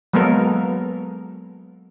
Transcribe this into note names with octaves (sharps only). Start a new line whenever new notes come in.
F#3 G#3 A#3 B3 A4 A#4